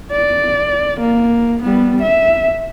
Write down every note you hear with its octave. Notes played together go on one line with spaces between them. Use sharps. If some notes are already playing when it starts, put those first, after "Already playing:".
D5
A#3
G3 B3
E5